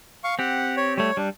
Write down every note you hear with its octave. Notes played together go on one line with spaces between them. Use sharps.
F5 C#6
C4 G4 F#5
C#5
G3 A3 C#5
G3 D4